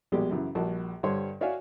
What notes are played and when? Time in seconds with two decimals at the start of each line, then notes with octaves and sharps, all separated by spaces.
0.12 A#1 B2 G3 G#3 G4 G#4
0.31 F#2 C#3 E3
0.55 A#1 G3 F#4 A5
1.03 G2 D3 G3 C5 C#5 C6
1.41 F#4 C#5 D5 E5 F5 G#5